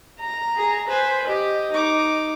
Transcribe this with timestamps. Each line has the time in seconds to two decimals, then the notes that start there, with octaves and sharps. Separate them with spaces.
0.20 A#5
0.56 G#4
0.88 B4 C5 G#5
1.27 G4 D#5
1.72 D#4 D6